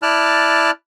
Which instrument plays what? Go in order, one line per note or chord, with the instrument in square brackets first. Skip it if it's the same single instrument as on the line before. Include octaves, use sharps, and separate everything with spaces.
[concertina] E4 D5 A5 F6 F#6